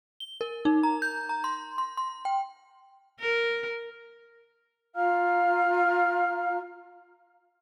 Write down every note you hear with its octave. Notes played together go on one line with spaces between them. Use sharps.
G7
A#4
D#4
A#5
G6
A#5
C6
C6
C6
G5
A#4
F4 F5 A#5 F6